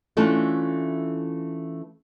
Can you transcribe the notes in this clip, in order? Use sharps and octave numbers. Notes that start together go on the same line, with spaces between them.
E3 A3 C#4 D4 F4 A4